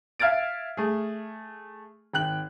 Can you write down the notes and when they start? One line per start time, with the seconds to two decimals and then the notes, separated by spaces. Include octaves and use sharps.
0.20 E5 F5 F6 G#6 A6 D7
0.77 A3 G#4
2.14 G#1 G5 F#6 F#7